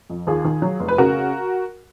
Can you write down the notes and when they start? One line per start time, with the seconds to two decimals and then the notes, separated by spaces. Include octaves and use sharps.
0.10 F2
0.27 D#2 F4 G#4
0.45 D#3
0.62 F#3
0.80 F1
0.88 B4
0.98 C#3 F#4 A#4